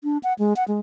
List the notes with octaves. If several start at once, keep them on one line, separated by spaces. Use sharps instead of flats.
D4
F#5
G#3
F#5
G#3